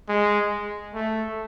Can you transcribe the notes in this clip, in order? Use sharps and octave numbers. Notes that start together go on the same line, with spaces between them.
G#3
A3